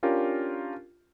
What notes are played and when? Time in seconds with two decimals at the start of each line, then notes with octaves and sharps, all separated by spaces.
0.03 C#4 D4 F4 G4 A#4